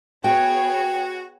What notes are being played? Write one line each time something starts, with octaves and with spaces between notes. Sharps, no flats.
B3 F#4 G#4 C#5 G5